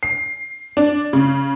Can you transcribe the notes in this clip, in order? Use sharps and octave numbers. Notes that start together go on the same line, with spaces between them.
C7
D4
C#3